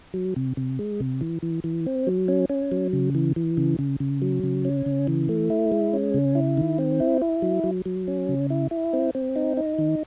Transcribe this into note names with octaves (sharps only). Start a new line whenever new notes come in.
F#3
C3
C3
G#3
C3
E3
E3
E3
C4
F#3
C#4
C#4
F#3
C#3
E3
E3
C#3
C#3
C#3
F#3
C#3
C#4
C#3
E3
A3
E4
G#3
C#4
C#3
E4
D#3
C4
E4
E4
F#3
F#3
F#3
C#4
C#3
E4
E4
C4
C4
D#4
D#4
D#3